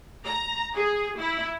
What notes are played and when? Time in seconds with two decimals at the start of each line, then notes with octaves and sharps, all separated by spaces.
0.25 A#5
0.74 G#4
1.18 E4